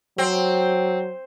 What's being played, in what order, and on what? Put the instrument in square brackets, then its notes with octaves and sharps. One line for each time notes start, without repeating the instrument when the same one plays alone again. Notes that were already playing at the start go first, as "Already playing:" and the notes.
[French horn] F#3 [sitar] C4